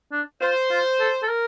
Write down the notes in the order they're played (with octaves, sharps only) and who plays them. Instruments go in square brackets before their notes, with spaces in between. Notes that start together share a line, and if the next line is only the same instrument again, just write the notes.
[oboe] D4
[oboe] F4 [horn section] C5
[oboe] F4
A4
A4
A#4